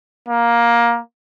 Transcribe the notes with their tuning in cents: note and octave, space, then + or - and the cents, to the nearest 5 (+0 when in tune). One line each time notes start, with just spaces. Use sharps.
A#3 +15